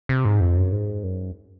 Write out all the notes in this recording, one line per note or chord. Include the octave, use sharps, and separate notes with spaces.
C3
G#2
F2
F#2
G#2
F#2